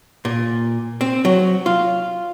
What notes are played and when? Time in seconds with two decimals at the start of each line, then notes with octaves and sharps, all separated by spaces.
0.25 A#2
1.01 C4
1.25 F#3
1.66 F4